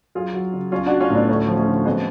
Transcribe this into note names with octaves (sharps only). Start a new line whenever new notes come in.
F#2 F4 G#4
F#3
C#3
B1 C#4 F4
D4 F#4
F#3
C#4 F4
A2 B3 D4
D2 A3 C#4
F3
A3 C#4
D3
F2 G#3 B3